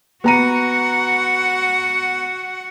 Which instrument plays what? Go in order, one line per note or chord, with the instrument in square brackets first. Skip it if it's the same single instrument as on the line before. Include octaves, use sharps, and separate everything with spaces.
[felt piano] B3 A#5 D#7 [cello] F#4 F#5